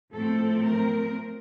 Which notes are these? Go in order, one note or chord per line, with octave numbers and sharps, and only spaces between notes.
A2 F3 A3 C4 A4
A#4